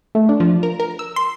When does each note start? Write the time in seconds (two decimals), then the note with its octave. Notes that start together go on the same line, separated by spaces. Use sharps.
0.15 A3
0.29 D4
0.40 F3
0.63 A#4
0.80 A#4
0.99 E6
1.16 C6